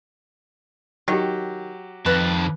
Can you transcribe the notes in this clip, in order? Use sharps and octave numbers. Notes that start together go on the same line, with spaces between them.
D#3 F#3 G4
F2 D#3 B4 A5